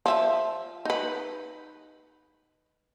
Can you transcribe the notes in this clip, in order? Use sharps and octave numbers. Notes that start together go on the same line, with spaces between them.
F3 E5
D#4 B4